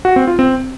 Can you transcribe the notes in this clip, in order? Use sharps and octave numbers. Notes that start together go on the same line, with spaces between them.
F#4
C4
F4
C4